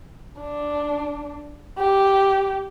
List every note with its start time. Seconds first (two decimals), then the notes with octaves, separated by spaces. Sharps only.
0.40 D4
1.78 G4